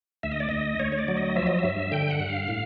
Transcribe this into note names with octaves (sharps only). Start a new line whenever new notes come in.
D2 E5
D#5
D5
D2 D#5
D2 C#5
C#5
D5
F#3
D#5
F3 E5
D#5
G2 E5
D3 G5
F#5
G2
F5
A2